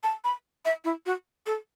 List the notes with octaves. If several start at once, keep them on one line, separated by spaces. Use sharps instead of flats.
A5
B5
E5
E4
F#4
A4